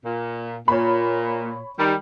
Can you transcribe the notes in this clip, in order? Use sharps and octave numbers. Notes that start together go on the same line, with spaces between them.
A#2
A#2 C#5 B5
D#3 G3